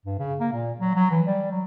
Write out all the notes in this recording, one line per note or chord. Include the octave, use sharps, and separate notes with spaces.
G2
C#3
A#3
A#2
F#3
F#3
E3
G3
F#3